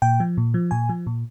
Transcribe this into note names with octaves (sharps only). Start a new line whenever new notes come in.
A#2 G5
F3
A#2
F3
A#2 G#5
F3
A#2